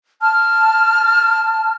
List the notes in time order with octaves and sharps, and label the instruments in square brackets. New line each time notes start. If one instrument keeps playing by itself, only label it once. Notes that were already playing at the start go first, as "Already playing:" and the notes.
[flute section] A5 F6